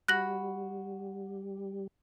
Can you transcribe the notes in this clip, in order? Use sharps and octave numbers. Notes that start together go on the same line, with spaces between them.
G3 F#4 B5 F#6 A#6 F#7